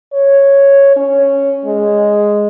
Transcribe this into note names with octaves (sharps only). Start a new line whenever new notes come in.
C#5
C#4
G#3